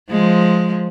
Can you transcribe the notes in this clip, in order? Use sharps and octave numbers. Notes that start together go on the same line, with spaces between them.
F3 G#3